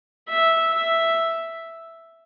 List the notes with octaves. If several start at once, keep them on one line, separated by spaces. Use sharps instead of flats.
E5
E5